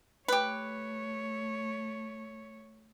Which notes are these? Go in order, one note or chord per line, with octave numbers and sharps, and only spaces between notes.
A3 G4 B4 C#5